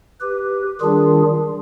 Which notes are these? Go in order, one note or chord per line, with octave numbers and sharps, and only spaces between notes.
G4 B4
D#3 G3 D4 F4 G#4